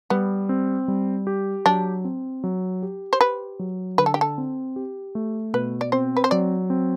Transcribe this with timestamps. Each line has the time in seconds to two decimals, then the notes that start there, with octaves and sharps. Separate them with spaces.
0.10 G3 B3
0.49 C4
0.88 G3
1.27 G4
1.66 F#3 D4
2.05 C4
2.44 F#3
2.83 G4
3.13 C5
3.20 G4 B4
3.59 F#3
3.98 D3 B4
4.06 A4
4.14 G4
4.21 A4
4.38 C4
4.76 G4
5.15 A3
5.53 B2 B4
5.81 D5
5.92 C4 C5
6.17 B4
6.24 C5
6.31 F#3 D5
6.70 C4